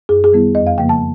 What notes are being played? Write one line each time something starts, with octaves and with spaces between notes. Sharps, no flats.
F#2 G#4
G#4
D#3 G3 B3 E4
F2 D#5
F5
C#3 F3 A#3 G5
A5